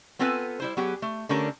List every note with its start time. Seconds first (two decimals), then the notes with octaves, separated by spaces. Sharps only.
0.19 B3 C4 F4 A4 B4 G#5
0.60 G3 E4 C5
0.77 F#3 B3 G4 G#4
1.02 A3
1.29 D3 A3 C#4 G4 A#4